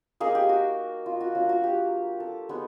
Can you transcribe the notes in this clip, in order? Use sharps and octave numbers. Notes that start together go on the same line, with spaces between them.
A#3 D#4 G#4
G4
F#4
F4
F#4
F#3 A#3 D4 F4
F#4
G4
A4
G#3 B3 D#4